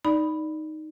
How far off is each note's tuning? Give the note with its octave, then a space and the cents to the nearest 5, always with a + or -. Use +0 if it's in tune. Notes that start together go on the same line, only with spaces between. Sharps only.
D#4 +0 D5 +0 B5 +0